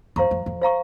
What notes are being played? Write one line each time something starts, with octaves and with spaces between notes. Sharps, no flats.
F2 C5 F5 A#5 C#6
F2
F2
C5 F5 A#5 C#6